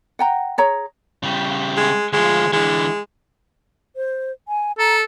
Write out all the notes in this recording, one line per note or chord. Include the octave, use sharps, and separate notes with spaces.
F#5 G5 A#5
G#4 C#5 A#5
C#3 G3
G#3
D2 F3 G#3
D3 E3 G#3
C5
G#5
A4 A#5